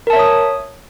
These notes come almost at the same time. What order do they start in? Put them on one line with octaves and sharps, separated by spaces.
A#4 A5 E5 C#5 D#6